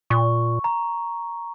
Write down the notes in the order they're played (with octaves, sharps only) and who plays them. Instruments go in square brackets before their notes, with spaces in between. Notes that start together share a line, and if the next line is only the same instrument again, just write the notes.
[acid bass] A#2 [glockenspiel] C#6
[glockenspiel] A#5